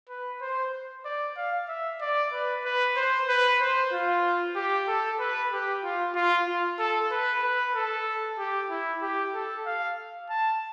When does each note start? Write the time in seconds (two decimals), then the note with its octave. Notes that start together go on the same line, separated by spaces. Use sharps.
0.09 B4
0.41 C5
1.05 D5
1.37 F5
1.68 E5
2.01 D5
2.33 B4
2.65 B4
2.96 C5
3.28 B4
3.60 C5
3.93 F4
4.56 G4
4.88 A4
5.20 B4
5.52 G4
5.84 F4
6.15 F4
6.47 F4
6.79 A4
7.11 B4
7.43 B4
7.75 A4
8.39 G4
8.71 E4
9.02 G4
9.35 A4
9.66 F5
10.30 A5